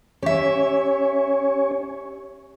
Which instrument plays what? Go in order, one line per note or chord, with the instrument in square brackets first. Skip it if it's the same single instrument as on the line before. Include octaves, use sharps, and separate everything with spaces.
[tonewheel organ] C#4 C#5 [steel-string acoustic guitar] G4 E5